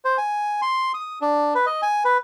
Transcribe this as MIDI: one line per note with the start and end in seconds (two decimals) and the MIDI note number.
0.05 0.17 72
0.18 0.61 80
0.62 0.92 84
0.94 1.19 87
1.22 1.54 62
1.55 1.66 71
1.66 1.81 75
1.82 2.03 80
2.05 2.17 71